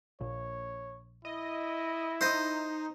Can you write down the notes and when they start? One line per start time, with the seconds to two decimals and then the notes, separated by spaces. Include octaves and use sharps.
0.21 A#1 C#5
1.25 E4 D#5
2.21 D#4 C5 D#5